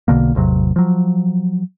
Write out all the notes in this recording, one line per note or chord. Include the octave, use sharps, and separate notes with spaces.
B1 B2 D3 A#3
A1 E2 C3 F#3
F3 F#3